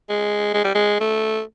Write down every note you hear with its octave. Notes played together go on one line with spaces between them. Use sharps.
G#3
G#3
G3
G#3
A3